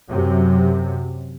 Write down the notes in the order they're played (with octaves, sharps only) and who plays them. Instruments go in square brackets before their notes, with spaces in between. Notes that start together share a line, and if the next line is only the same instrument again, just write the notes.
[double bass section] F#2 C3 F#3